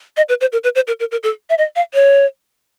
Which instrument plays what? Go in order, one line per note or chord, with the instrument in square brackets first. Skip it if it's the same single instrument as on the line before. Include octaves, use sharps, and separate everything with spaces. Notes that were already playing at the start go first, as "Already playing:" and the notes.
[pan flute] D#5
B4
C5
A#4
B4
C5
A#4
A#4
A#4
A4
E5
D#5
F5
C#5